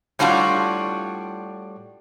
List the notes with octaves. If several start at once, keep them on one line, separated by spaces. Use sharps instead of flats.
A2 G3 D4 F4 F#4